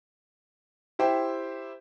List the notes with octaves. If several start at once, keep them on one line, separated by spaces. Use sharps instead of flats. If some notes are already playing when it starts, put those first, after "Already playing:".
E4 G4 C5 E5 G5